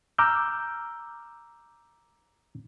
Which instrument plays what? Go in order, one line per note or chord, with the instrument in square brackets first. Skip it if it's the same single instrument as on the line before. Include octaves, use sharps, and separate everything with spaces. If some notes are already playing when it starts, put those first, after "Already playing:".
[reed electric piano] A#5 D6 E6 F6 G6